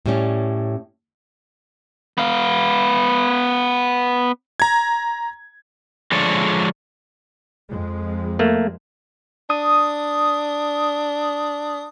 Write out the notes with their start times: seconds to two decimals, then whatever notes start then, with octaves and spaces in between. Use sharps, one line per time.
0.06 A2 G3 C#4
2.18 B3 F5
4.60 A#5 G#6
6.12 D3 F3 G#3 D4 C#5 D5
7.69 F2 G#3
8.39 A3 A#3
9.50 D4 D#6